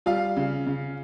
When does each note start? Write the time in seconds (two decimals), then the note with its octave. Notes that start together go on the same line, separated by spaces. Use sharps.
0.06 G3 F4 F5
0.37 C#3
0.66 C#3